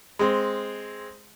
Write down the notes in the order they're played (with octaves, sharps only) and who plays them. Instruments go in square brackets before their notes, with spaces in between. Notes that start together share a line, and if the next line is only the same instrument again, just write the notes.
[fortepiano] G#3 C4